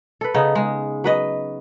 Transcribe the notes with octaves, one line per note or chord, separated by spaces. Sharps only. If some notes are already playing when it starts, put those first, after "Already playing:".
A4 B4
C#3 B3 D#4
G#3
F#3 B4 D#5